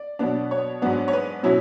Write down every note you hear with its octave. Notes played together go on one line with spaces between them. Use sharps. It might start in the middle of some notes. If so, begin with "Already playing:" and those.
Already playing: D5
B2 F#3 B3 D4
C#5
G#2 F#3 B3 D4
C#5
B4
B2 F#3 C#4 E4